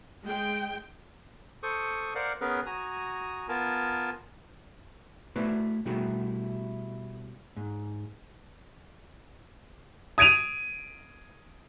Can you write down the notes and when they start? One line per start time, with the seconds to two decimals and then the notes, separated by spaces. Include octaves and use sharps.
0.24 G#3 G5
1.63 A4 C5 C#6 D#6
2.15 A#4 C5 D5 F5 F#5
2.41 B3 C#4 G#4 A#4 B4
2.66 F#4 G#5 A#5 D#6
3.49 B3 F4 A#4 G#5 A5
5.36 A3 E4 F#4 B4 C5 D5
5.85 B2 G3 A3 E4 F#4 G#4
7.56 G#2
10.18 D#6 G#6 D7 D#7 F7